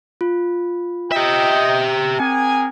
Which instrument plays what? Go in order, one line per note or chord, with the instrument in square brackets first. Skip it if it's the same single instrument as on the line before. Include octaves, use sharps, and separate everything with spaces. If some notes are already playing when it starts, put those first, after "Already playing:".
[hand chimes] F4
[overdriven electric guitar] G4 E5 [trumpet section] D#5 G5
[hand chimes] C4 G5 [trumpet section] G#4 A#4 G#5